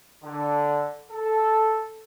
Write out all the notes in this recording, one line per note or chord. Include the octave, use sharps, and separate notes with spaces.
D3
A4